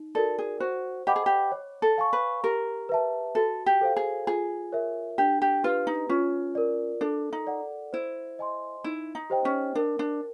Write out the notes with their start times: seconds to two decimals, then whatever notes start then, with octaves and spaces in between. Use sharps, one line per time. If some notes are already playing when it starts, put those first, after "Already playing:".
Already playing: D#4
0.15 F#4 A4 A#4 D5
0.39 G#4
0.60 F#4 C5
1.07 G4 D#5 F#5 B5 D6
1.16 G#4
1.26 G4
1.52 C#5
1.82 A4
1.98 F5 G#5 C#6
2.13 B4
2.44 G4 A#4
2.89 B4 E5 A5
3.35 F#4 A4
3.66 G4
3.81 A4 C5 F5
3.96 G#4
4.27 F4 G#4
4.72 A#4 C#5 E5
5.18 D4 G4
5.42 G4
5.64 F4 G4 B4
5.87 D#4
6.09 C#4 F4
6.55 A#4 D5
7.01 D4 A4
7.33 D#4
7.47 D5 F#5
7.93 E4 C5
8.39 D#5 G#5 C6
8.84 D#4 E4
9.15 D#4
9.30 G4 C5 D#5 G5
9.45 C#4
9.75 D4 A#4
9.99 D4